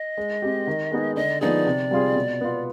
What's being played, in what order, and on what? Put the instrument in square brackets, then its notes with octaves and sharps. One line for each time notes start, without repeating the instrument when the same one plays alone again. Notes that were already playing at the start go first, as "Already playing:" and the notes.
Already playing: [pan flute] D#5
[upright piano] G#3
C4 G4
D#3
G#3 B3 D#4 G#4
[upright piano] D3 [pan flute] D#5
[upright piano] F3 B3 D#4 G#4 [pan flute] D5
[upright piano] C3
G3 C4 F4 G#4
B2
B3 F4